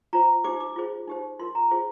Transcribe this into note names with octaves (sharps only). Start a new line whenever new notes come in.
F4 C5 A#5
D#4 G4 C5 D6
D6
F4 G#4 C5
D#4 G4 C5
F4 A#4 C6
A#5
F4 G#4 C5